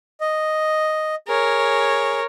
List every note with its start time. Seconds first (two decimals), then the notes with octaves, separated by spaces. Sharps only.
0.21 D#5
1.28 G#4 A#4 C#5